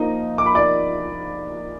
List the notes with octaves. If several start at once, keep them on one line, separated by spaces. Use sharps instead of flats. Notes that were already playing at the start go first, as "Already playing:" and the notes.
Already playing: F3 A#3 D#4 D#5
D6
B5
D5 D6